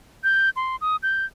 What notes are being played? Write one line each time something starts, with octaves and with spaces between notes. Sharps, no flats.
G6
C6
D#6
G6